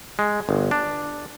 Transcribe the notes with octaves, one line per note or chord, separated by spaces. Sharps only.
G#3
G1
D4